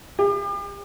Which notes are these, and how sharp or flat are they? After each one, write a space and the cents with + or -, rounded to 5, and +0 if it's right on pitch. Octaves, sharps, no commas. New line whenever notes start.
G4 +40